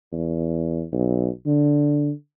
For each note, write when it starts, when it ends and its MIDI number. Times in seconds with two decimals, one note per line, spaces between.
0.12 0.84 40
0.92 1.29 35
1.46 2.11 50